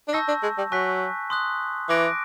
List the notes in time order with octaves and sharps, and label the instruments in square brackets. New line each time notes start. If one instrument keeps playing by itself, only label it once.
[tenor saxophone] D4
[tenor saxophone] D#4 [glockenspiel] A5 C#6 E6 G6 A#6
[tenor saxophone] D4
G#3
G3
[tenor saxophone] F#3 [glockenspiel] G#5 C#6 F#6 B6
[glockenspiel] C6 D#6 F#6
[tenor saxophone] E3 [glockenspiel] D6 F#6 A#6 D7